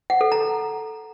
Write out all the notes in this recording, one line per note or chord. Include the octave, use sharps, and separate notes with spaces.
F#5
A4
A#5